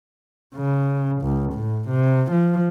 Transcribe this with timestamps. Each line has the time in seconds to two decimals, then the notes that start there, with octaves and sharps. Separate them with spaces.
0.55 C#3
1.22 C#2
1.53 A2
1.89 C3
2.31 F3